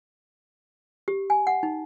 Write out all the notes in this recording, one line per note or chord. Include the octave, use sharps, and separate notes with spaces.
G4
G#5
F#5
D#4